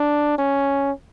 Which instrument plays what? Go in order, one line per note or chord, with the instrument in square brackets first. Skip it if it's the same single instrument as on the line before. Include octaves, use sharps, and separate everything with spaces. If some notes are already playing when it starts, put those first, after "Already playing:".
Already playing: [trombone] D4
C#4